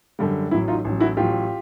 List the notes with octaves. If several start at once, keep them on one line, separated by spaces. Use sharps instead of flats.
F#2 D3 G3
A1 A2 F#3 E4
D#4 F4
A1 A2 F#3
E4 F#4
A1 A2 F#3 F4 G4